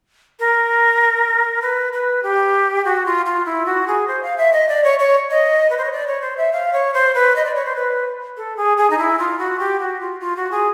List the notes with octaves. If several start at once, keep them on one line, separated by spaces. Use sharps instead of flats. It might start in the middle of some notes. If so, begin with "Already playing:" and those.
A#4
B4
B4
G4
F#4
F4
F4
E4
F#4
G#4
C5
F5
E5
D#5
D5
C#5
C#5
D#5
B4
C5
C#5
D5
C#5
C5
E5
F5
C#5
C5
B4
D#5
D5
C#5
C5
B4
A4
G#4
G#4
D#4
E4
F4
F#4
G4
F#4
F4
F4
F#4
G#4